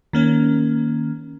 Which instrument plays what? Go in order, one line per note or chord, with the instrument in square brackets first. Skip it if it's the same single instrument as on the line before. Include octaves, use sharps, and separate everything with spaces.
[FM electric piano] D#3 A#3 C#4